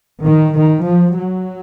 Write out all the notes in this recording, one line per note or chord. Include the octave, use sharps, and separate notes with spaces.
D#3
D#3
F3
F#3